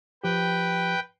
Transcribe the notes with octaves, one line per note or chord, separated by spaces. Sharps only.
F3 G4 B4 G5